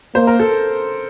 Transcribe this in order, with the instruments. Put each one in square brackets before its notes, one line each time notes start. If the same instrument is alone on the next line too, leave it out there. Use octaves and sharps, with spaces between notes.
[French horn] A#3 [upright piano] C5
[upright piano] A#4
A4